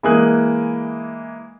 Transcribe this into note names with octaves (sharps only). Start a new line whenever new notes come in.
E3 G#3 A#3 G#5 D#6 F#6